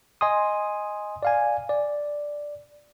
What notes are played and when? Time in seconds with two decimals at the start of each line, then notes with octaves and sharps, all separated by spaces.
0.21 D#5 G#5 C6 D#6
1.23 D5 F5 G#5
1.69 D5